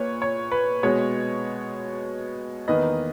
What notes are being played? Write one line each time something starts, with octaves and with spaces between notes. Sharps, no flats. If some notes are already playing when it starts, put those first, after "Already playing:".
Already playing: A#2 A#3 B4 C#5
C#5
B4
B2 G#3 B3 C#5
E2 D#3 A#3 B4 D#5